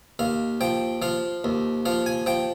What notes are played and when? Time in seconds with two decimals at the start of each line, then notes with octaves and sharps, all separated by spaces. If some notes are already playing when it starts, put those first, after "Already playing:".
0.19 D#2 F5
0.61 F3 G5
1.02 F3 F5
1.44 D#2
1.86 F3 F5
2.06 G#5
2.26 F3 G5